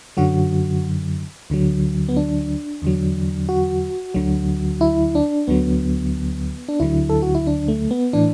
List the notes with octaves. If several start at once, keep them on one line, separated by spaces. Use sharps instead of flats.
F#2 D3 F#3 F#4
D2 D3 F#3
B3
D4
E2 D3 F#3
F#4
D2 D3 F#3
E4
D4
D2 D3 F#3 B3
D4
D2 D3 F#3 E4
A4
F#4
E4
D4
A3
B3
A2 E3 D4